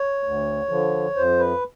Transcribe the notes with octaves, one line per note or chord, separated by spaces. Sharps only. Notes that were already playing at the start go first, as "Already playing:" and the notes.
Already playing: C#5
D2
D3 F3
F2 C5
B4